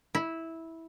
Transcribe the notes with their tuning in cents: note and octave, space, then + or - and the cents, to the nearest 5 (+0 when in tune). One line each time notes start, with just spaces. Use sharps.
E4 -10